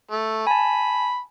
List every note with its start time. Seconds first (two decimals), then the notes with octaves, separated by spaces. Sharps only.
0.11 A3
0.47 G#5 A5 B5